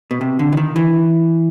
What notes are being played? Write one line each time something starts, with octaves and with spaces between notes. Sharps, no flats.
B2
C3
D3
E3
D#3
E3